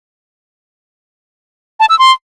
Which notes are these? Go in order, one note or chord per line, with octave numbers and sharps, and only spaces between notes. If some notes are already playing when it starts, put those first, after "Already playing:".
A5
E6
C6